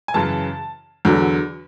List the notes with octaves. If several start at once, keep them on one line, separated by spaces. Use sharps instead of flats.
G#5
F#2 C#3 E3 A5
E2 D3 F#3